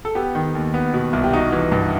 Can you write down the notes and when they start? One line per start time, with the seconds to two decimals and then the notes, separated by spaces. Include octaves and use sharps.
0.05 A4
0.15 B3 G4
0.35 D#3
0.55 D#2
0.74 B3
0.94 B2
1.13 C2
1.24 G4
1.33 D#4 F#4
1.52 E3
1.72 G2